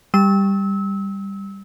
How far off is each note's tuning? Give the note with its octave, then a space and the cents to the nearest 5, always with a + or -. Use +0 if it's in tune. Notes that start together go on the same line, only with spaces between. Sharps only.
G3 +10 E6 -30